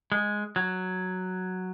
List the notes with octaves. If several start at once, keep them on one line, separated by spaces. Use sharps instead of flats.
G#3
F#3